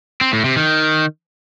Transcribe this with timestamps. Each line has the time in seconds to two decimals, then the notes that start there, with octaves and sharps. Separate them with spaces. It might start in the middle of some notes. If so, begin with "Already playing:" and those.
0.21 C4
0.33 A2
0.45 C3
0.57 D#3